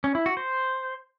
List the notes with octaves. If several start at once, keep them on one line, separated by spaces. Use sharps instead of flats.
C#4
E4
F#4
C5